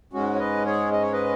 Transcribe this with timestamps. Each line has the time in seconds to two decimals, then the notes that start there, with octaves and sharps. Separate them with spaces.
0.13 G#2 G#3 C#4 F#4
0.35 C#5
0.39 B4 D#5
0.66 G#4 C#5
0.92 D#5
1.02 C#5
1.12 B4 D#5